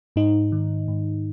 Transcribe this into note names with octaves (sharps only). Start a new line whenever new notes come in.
G#2 D#4
D#3
G#2